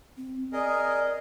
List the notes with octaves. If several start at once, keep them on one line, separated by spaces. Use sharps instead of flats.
C4
G#4 A#4 D5 D#5